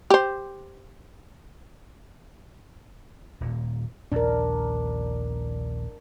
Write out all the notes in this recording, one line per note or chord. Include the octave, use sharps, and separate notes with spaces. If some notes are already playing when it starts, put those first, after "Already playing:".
G4 C5
D#1 A#2
A#1 D#2 D#3 D4 A#4